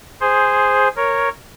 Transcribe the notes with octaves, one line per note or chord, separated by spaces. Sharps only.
G#4 C5
A#4 C#5